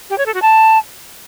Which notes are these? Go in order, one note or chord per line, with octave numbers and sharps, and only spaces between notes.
G4
C#5
A4
F#4
A5